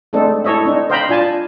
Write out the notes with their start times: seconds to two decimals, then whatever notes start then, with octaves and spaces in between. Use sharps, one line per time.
0.13 G#3 A3 C4 D4 D#4 A4
0.45 E4 A4 C#5 D#5 E5
0.65 C4 D4 D#4
0.90 C5 D#5 F5 G5 A#5 B5
1.09 D4 F4 G#5 A5